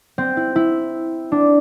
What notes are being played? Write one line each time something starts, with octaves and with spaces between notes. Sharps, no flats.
C4
E4
E4
D4